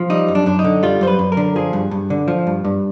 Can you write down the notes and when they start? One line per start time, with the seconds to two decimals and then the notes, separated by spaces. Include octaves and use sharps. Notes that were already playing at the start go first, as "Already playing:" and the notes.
Already playing: F3
0.10 G3 D#4
0.28 F#2
0.35 D4
0.46 F#2 D4
0.59 D#4
0.64 D3
0.83 G3 F4
1.01 F#2 C5
1.07 B4
1.19 F#2
1.32 A#4
1.37 D3
1.56 F3 G#4
1.73 G2
1.91 G2
2.10 D3
2.28 F3
2.47 G2
2.65 G2